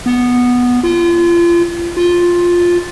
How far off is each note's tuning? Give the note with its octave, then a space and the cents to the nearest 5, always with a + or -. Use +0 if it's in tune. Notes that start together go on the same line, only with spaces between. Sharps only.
B3 -5
F4 -30
F4 +5